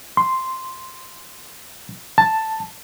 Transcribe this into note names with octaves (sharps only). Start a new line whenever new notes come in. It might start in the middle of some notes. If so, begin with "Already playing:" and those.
C6
A5